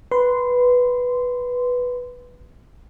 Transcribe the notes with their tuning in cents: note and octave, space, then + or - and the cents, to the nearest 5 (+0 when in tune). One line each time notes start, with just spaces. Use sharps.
B4 +0 C6 -15